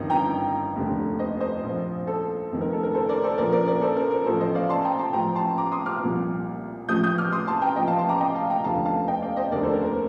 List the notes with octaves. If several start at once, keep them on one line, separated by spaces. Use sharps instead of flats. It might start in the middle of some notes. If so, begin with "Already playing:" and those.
Already playing: G1 F2 D#3 D#5
G5 A#5
F1 D#2 D3
C5 D#5
C5 D#5
A#1 A#2 F3
A4 C5
F1 F2 D#3
A#4
A4
A#4
A4 C5
A#4 D5
A4 C5
A#1 A#2 F3 A#4 D5
A#4 D5
A#4 D5
A4 C5
A#4
A#4
A1 A2 F3 A4 C5
C5 D#5
D5 F5
A5 C6
G5 A#5
A5 C6
A1 A2 F3 G5 A#5
A5 C6
A#5 D6
C6 D#6
D6 F6
C2 A#2 F3
A1 A2 F3 D#6 G6
D#6 G6
D6 F6
C6 D#6
A5 C6
G5 A#5
A1 A2 F3 D#5 G5
F5 A5
A5 C6
A#5 D6
D#5 G5
F5 A5
G5 A#5
F1 D#2 D3 F3 F5 A5
F5 A5
D#5 G5
D5 F5
C5 D#5
F1 D#2 D3 A#4 D5
A4 C5
A#4
A#4